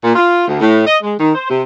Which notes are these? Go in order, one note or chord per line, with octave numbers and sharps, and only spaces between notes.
A#2
F4
D2
A2
D#5
G#3
D#3
C5
C3